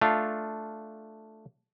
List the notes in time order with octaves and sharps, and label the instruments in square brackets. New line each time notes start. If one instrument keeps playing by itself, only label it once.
[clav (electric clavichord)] A3 D4 F4 F5